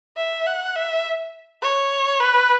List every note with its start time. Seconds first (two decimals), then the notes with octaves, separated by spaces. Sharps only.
0.17 E5
0.47 F#5
0.76 E5
1.62 C#5
2.20 B4